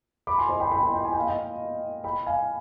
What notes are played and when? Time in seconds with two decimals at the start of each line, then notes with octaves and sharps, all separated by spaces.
0.27 B5 D6
0.38 G#5 C6
0.49 C5 D#5
0.60 G5 B5
0.71 G5 B5
0.82 D#5 G5
0.93 D#5 G5
1.05 G#5
1.12 G5
1.19 F5
1.27 D#5 G5
2.04 G5 B5
2.26 F5 G#5